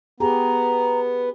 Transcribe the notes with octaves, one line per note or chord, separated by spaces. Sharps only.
B3 G4 G#4 A#5